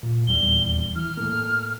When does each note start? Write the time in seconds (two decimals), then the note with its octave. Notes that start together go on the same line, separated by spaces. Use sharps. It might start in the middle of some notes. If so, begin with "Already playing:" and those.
0.03 A#2
0.27 D#1 E2 G3 G7
0.96 E3 F6
1.17 A2 A3 A#3